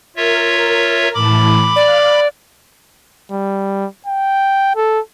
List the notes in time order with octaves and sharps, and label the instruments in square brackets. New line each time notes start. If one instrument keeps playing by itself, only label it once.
[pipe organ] F4 C#5 E5 [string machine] A#4
[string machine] A2 E3 A5 [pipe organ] B5 D6
[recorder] D5 [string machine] F5 F6 F#6
[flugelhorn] G3
G5
A4